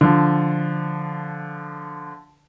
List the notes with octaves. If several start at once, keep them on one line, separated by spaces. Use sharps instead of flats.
D3 F3